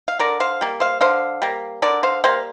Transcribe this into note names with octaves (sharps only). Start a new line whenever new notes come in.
F5
D3 A#4 D5
C5 F5
G3 A#3
C5 F5
D3 C5 F5
G3 A#3
D3 A#4 D5
C5 F5
G3 A#3 C5 F5